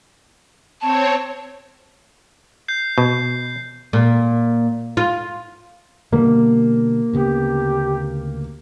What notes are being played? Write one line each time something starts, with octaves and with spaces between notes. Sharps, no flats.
C4 C#5 A5
G6 C7
B2
A#2
F4
B2 D3 G3 A#3
D2 C#3 B3 G4